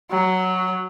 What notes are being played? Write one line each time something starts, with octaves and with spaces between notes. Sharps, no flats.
F#3